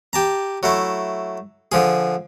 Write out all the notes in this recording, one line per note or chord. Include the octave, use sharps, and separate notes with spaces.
G4 A5 A#5
F#3 A3 E4
D3 F3 G#4